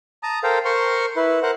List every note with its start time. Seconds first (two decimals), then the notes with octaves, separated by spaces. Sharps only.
0.23 A5 A#5 D#6
0.43 A4 A#4 C5 F5 G5
0.65 A#4 C5 C6 C#6
1.16 E4 B4
1.43 A#4 C5 F#5